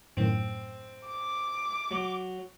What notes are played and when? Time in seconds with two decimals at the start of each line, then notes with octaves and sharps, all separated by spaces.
0.17 F#2 A2 D#3 C4
1.08 D6
1.91 F#3